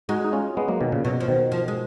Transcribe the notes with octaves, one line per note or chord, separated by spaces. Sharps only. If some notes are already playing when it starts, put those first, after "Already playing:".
G#3 D#4 F#4
D#4
C#4 F4
G#3 B3
F#3 A#3
B2 D#3
A#2 C#3
B2 F#3
F3
B2 D#3
F3
G#3